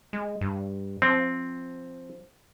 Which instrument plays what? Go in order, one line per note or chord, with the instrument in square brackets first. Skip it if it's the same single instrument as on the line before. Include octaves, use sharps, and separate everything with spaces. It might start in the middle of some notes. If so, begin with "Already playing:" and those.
[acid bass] G#3
G2
[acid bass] F3 [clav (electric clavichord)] C4